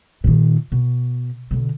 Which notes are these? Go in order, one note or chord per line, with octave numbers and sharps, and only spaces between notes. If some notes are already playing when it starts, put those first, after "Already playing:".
A#2 D#3
B2
B2 D3